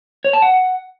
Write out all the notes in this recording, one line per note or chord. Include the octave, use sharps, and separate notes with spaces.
C#5
A5
F#5